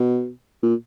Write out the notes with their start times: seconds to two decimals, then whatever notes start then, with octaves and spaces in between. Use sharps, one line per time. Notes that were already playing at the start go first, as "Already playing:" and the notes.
Already playing: B2
0.63 A#2